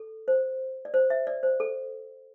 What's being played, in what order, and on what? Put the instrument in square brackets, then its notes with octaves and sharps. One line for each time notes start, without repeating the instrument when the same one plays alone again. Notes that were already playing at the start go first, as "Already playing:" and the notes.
Already playing: [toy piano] A4
C5
D5
C5
E5
D5
C5
A4